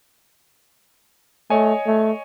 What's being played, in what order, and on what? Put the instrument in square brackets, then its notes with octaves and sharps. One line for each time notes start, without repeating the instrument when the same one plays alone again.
[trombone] A3 [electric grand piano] C#5 D#5 G#5
[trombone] A3